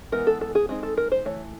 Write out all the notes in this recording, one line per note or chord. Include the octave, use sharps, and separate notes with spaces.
E3 G#3 B3 A#4
A4
A4
G#4
G#3 C4 D#4 G#4
A4
A#4
C5
E3 A3 C#5